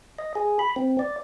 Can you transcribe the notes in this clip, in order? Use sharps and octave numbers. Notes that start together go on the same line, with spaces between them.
D#5
G#4
B5
C4
D5